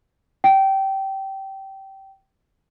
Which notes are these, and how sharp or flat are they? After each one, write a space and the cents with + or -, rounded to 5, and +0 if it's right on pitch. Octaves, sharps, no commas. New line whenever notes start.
G5 -20